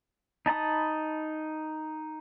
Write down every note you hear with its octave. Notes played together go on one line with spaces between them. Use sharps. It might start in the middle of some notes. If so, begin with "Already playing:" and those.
D#4 A5 B5 D#6